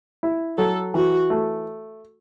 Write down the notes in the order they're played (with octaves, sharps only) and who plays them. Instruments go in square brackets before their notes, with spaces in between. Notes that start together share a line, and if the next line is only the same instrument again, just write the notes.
[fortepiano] E4
[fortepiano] F#3 [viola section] A4
[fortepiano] E3 [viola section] F#4
[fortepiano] A3